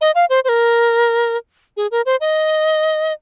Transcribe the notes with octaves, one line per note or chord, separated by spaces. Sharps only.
D#5
F5
C5
C5
A#4
G#4
A#4
C5
D#5